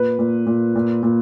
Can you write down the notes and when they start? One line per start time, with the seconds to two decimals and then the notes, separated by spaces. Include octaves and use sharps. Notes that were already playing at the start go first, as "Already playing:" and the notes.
Already playing: A#2 B4
0.19 A#2
0.46 A#2
0.75 A#2
1.03 A#2